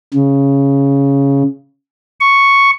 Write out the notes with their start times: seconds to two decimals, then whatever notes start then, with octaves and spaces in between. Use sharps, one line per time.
0.14 C#3
2.20 C#6